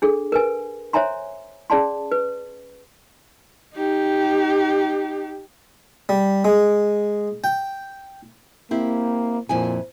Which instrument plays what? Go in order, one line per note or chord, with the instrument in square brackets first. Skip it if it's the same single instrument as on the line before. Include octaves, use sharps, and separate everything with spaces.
[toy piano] D4 G#4 A4
A#4 B4 G#5
C5 C#5 E5 G#5 A#5 C6
C#4 G#4 D5 A5 C6
B4
[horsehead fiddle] D#4 G4
[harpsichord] G3
G#3
G5
[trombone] A#3 [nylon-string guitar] C4 E4 G4
[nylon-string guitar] F2 E4 G#5 [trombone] A#2